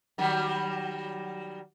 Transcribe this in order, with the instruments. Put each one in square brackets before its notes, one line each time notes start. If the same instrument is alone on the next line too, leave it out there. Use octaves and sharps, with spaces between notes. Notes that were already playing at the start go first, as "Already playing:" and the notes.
[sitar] D#3 F#3 G3